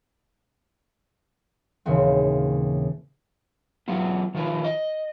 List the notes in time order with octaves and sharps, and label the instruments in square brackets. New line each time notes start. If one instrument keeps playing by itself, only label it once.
[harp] D#2 A#2 C#3 E3 C4
[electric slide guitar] F#3 B3 E4 F4
D#3 F3 F4 B4
D#5